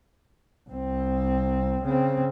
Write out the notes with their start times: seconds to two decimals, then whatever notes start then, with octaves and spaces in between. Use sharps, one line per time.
0.69 C2 C4
1.84 C#3 C4